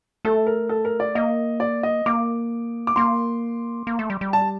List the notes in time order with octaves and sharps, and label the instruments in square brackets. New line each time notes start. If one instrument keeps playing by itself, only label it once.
[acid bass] A3 [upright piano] A4
[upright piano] A#4
A4
A#4
D5
[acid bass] A#3 [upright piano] D#5
[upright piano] D5
D#5
[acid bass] A#3 [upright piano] D6
[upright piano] D6
[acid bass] A#3 [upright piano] C6
[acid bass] A#3
A3
G3
G3
[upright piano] A5